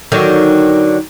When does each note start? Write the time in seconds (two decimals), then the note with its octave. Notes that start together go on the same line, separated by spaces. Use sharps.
0.12 D3 D#3 F#3